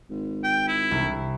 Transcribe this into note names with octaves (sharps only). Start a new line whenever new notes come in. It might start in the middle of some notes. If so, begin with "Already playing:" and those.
G#1
G5
E4
C2